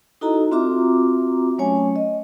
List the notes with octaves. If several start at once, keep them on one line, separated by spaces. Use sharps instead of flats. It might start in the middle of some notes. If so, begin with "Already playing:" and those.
D#4 E4 F#4 A4 D#5 A#5
C4 F4 F#4 E5 A#5 D6
F#3 A3 C#4 C#5 G#5
D#5